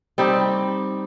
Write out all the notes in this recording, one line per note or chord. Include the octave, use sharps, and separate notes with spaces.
G3 C4 D#4 G4